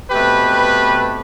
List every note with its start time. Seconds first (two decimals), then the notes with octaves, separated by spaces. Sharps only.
0.11 B2 A3 C4 G4 B4